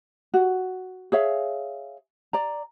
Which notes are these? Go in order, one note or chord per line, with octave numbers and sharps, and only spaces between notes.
F#4
G#4 C#5 E5 F5
D5 A#5